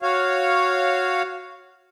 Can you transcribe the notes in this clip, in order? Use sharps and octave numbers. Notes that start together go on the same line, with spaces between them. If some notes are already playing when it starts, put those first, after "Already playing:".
F#4 C#5 F5